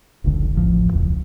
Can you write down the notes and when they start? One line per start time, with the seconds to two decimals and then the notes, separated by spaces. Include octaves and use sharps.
0.24 F1 C#2 D3
0.53 D1 A1 A2 F3
0.91 E1 C#2 F3